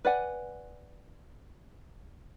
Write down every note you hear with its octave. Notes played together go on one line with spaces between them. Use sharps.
B4 D5 F#5 G#5